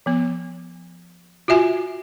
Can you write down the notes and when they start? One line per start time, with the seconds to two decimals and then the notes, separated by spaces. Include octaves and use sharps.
0.06 F3 B3
1.48 F4 F#4 E5 G#5